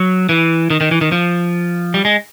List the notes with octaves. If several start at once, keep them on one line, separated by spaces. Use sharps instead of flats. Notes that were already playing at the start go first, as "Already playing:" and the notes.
Already playing: F#3
E3
D#3
D#3
E3
D#3
F3
G3
G#3